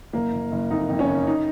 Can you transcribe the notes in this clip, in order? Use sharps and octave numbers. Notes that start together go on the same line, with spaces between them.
F#1 A#3
F#1
F#1
F2 D#4
F2
C#4
F#1
D#4